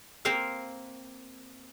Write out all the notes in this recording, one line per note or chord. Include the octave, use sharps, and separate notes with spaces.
A#3 C4 A#4 C5 F5